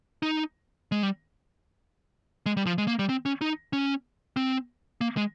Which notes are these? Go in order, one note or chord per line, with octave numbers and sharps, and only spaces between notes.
D#4
G#3
G3
G#3
G3
F3
G#3
A#3
G3
C4
C#4
D#4
C#4
C4
A#3
G#3